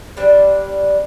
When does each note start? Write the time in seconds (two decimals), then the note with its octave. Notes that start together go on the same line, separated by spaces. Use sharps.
0.17 G3 D4 C5